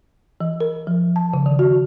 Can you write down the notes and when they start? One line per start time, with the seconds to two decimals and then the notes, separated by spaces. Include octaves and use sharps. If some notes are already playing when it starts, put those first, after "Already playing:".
0.41 E3
0.61 A#4
0.87 F3
1.16 A5
1.34 C#3
1.46 D#3
1.59 F#4